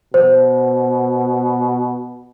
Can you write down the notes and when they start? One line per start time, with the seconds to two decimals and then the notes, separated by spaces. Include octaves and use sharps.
0.14 B2 C5